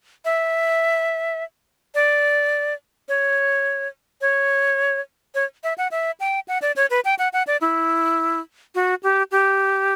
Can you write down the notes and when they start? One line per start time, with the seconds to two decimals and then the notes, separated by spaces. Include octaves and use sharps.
0.25 E5
1.95 D5
3.09 C#5
4.21 C#5
5.35 C#5
5.64 E5
5.78 F#5
5.91 E5
6.20 G5
6.48 F#5
6.62 D5
6.76 C#5
6.90 B4
7.05 G5
7.19 F#5
7.33 F#5
7.47 D5
7.61 E4
8.75 F#4
9.03 G4
9.31 G4